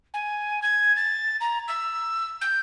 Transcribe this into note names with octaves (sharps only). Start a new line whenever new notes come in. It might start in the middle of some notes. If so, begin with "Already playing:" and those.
G#5
G#6
A6
A#5
E6
G6